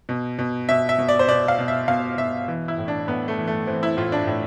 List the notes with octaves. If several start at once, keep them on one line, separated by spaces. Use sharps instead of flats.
B2
B2
B2 E5
E5
B2
D5
C5
B2 D5
F5
B2
E5
B2 F5
B2 E5
E3
E4
A2
D4
A2 B3
A3
E3
A3
E3 C4
E4
A2 F4
D4
A2